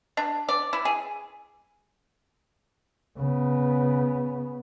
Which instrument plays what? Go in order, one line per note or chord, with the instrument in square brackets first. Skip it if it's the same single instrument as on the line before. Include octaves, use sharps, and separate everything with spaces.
[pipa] D4
D5
E4
G#4
[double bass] C#3 B3